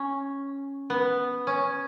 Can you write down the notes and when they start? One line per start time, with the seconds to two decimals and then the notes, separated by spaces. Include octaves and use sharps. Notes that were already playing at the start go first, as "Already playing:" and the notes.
Already playing: C#4
0.90 B3
1.47 C#4